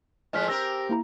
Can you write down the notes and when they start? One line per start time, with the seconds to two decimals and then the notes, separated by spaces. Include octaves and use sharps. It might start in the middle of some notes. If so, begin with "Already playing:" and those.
0.33 A2 F3 G#3 D#5 F6 B6
0.48 C4 G4 A#4 E6 A#6
0.89 A#3 E4 A#5